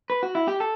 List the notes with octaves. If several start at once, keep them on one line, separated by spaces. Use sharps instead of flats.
B4
F#4
E4
G4
A4